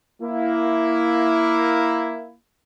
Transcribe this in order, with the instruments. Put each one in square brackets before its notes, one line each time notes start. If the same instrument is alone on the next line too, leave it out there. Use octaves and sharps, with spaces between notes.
[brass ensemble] A#3 E4